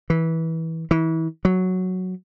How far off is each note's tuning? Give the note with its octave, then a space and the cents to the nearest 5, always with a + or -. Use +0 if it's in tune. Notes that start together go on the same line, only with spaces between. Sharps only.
E3 -20
E3 -30
F#3 +0